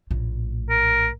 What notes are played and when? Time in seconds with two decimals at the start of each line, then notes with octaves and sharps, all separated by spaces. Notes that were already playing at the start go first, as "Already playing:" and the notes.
0.11 A#1 A2
0.70 A#4